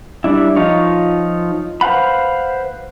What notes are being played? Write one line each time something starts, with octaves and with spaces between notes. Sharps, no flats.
G3 D4 E4
F3 D#4 F4 C#5
B4 C5 F5 F#5 B5